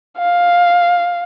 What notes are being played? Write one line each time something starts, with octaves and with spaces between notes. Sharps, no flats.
F5